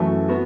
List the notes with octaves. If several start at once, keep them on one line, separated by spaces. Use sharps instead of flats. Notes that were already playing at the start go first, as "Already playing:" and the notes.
Already playing: F#2 E3 A3 F#4
B3 F#4